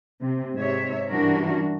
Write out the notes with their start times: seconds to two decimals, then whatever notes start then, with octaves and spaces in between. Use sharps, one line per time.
0.20 C3
0.54 G#2 C3 C#5 E5
1.10 G2 E3 D4 F#4 A#4